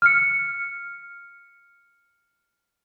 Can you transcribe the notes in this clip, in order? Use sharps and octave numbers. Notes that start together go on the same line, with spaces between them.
F6 C#7